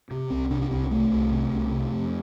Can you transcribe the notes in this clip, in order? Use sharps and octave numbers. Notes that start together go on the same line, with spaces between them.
C3
C2 C4
C3 D4
D4
C2 C4
C3 A3
C2
C3
C2
C3
F2